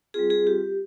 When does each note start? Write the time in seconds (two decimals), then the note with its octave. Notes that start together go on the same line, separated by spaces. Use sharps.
0.14 G3 C4 F4 G#4
0.30 G#4
0.47 G4